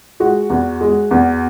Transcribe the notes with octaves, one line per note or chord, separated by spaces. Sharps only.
G#3 F#4
E2
G#3
E2